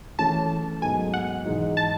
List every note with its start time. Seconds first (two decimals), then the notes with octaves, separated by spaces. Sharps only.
0.19 E3 A3 C#4 A5
0.82 G#2 F#3 B3 D#4 A4 G#5
1.14 F#5
1.45 G#2 E3 G#3 D#4
1.77 A5